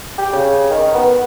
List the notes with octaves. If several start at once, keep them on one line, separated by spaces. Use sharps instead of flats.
G4
C#3
D#3
B3